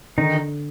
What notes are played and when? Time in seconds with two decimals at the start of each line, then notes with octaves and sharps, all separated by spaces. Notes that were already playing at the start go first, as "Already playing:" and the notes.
0.18 D3 D#3 D#4